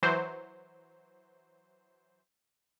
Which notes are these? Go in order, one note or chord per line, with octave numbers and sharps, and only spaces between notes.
E3 F#3 C5